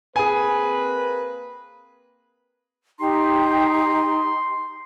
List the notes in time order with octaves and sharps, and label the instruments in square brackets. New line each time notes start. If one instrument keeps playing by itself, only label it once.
[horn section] A#3 C4 B4 [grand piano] G#4 G#5
[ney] D#4 [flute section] G4 A#5 [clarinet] C6